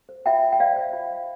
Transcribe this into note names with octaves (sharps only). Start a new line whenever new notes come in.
C5
F4 E5 G5
F4
G5
C5 D5 F5
C5
F4
C5